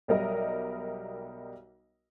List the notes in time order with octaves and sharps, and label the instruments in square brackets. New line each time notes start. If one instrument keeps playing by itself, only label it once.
[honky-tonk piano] B1 G3 A#4 D#5 E5